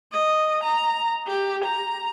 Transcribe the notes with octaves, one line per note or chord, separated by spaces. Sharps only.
D#5
A#5
G4
A#5